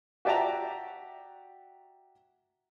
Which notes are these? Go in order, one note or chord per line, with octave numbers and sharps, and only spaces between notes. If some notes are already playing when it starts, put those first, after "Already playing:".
F#4 G4 D5 E5 A5 A#5